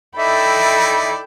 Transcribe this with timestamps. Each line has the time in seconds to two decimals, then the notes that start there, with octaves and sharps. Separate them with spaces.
0.17 D#4 E4 A4 D5 E5 G5 B5